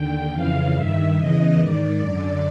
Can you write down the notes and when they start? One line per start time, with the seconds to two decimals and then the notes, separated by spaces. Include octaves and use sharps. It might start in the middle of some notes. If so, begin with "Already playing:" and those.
Already playing: D#2 D3 G5
0.32 F2 C#3 E3 F5
0.74 G2 D#3 E5
1.16 E2 C#3 E3 D#5
1.57 G#2 D#3 D5
1.99 F#2 D3